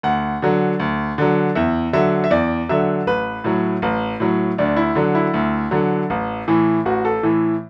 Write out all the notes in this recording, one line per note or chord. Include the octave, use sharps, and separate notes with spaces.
D2 F#5
D3 F#3
D2
D3 F#3
E2 E5
D3 F#3 E5
E5
E2 D5
D3 F#3 E5
A1 B4
A2 F#3
A1
A2 F#3
D2 D4
E4
D3 F#3
E4
D2
D3 F#3
A1
A2 E3
A1 F#4
A4
A2 E3